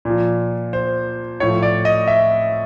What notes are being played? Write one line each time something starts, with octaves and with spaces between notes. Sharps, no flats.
A#2 F3
C5
A2 F3 C#5
D5
D#5
E5